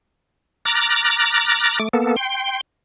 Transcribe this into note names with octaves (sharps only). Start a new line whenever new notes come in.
A#5 D6 F6 F#6 A6 A#6
A3 D6
A#3 B3 A4
G5 C6